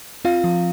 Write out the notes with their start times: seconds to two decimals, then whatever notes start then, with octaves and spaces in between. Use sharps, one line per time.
0.25 C4 F4 F5
0.44 F3